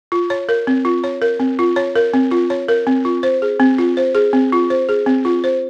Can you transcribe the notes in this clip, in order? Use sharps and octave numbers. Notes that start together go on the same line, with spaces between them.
F4
C#5
A#4
C4
F4
C#5
A#4
C4
F4
C#5
A#4
C4
F4
C#5
A#4
C4
F4
C5
G#4
C4
F4
C5
G#4
C4
F4
C5
G#4
C4
F4
C5